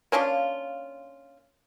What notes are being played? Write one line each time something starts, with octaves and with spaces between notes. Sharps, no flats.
A#3 C#4 D4 F4